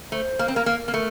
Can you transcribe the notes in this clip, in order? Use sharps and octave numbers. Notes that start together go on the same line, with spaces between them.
A3 C5
A#3
C4
A#3 A#4
A#3
A#3
A3 A#4